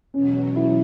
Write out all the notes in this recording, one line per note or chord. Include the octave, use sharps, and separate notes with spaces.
E2 B2 F#3 C#4
E4